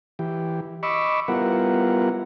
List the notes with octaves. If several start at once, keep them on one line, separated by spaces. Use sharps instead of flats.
E3 G4
D#5 B5 C#6 D6 E6
G3 B3 E4 F4 A#4 F#5